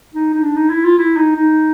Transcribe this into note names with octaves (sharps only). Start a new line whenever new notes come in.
D#4
D#4
D4
D#4
E4
F4
E4
D#4
D#4